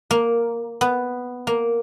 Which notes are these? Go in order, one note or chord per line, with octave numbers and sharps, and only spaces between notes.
A#3
B3
A#3